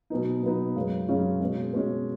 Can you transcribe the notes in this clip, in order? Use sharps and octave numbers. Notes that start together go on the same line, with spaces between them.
B2 F#3 B3 D#4
B2 F#3 B3 D#4
F#2 C#3 G#3 C#4
F#2 C#3 G#3 C#4
B2 G#3 C#4
B2 G#3 C#4